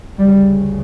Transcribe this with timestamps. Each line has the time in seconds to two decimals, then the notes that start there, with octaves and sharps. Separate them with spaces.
0.18 D2 C#3 G3